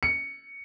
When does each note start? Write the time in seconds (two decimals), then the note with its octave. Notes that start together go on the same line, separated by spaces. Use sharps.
0.03 C#7